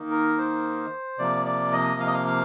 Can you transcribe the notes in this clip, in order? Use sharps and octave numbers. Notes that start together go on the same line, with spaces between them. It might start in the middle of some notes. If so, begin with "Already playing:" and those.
Already playing: D#3 A#3 D#4
A#4
C5
C3 F3 A#3 D5
D5
D#5
F5
D#5
F5
F5